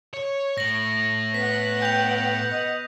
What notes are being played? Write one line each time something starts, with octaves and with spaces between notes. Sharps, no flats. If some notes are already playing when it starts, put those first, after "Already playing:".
C#5
A2 A#6 F#7
B3 F#5 B6
G5 G6 F7
D#5